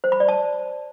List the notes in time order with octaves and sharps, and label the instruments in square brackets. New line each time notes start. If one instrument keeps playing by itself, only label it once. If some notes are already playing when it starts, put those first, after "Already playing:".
[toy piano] C5
B5
D5
A5